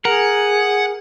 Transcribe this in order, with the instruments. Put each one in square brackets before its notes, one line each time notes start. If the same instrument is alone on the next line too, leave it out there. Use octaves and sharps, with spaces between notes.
[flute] G#4 [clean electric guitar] A#4 [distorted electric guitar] F#5